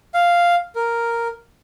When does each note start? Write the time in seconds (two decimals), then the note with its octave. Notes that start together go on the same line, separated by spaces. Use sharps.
0.14 F5
0.75 A#4